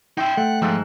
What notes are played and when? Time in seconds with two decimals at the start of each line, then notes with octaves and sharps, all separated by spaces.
0.17 D#4 E5 G5 C6
0.37 A3 F#5
0.62 G#2 F3 E6 F#6